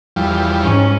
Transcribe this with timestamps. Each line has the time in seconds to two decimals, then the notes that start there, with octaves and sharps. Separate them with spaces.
0.16 E2 F3 G3
0.63 G#2 C#4